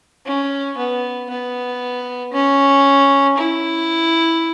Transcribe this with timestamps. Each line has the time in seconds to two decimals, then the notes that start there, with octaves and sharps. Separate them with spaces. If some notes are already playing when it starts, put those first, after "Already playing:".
0.26 C#4
0.78 B3
1.30 B3
2.33 C#4
3.37 E4